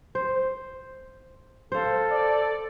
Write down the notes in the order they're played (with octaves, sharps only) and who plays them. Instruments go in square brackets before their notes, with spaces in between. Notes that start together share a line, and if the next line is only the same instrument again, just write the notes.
[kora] C5
[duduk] A4 [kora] C5 F5
[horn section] D5